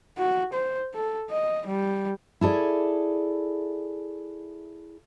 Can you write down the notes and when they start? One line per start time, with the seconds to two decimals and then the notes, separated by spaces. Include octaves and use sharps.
0.19 F#4
0.54 C5
0.94 A4
1.30 D#5
1.67 G3
2.41 E4 G#4 A4 D5